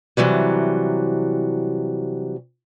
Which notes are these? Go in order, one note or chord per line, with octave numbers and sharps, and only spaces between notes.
C3 E3 F#3 G3